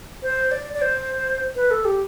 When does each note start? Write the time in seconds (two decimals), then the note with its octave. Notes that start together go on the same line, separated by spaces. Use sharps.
0.23 C5
0.51 D5
0.74 D5
0.82 C5
1.56 B4
1.71 A4
1.85 G4